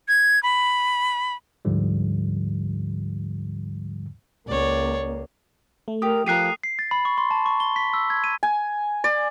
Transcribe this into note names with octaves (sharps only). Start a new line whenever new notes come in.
G#6
B5
D2 G#2 D3 F3 G3
C#2 A#3 C#5 D5
A3
G4 A#4 D#6
F3 G4 A#4 F#6 C7 D#7
C7
A6
B5
C#6
C6
A5
C#6
G7
B6
E6
G#6
D#7
G#5
D5